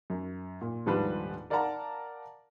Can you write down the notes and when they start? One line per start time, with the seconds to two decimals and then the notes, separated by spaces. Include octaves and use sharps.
0.10 F#2
0.61 A#2
0.86 D#1 G#2 F3 G3 D4 B4
1.50 A#4 D5 F5 F#5 A5 A#5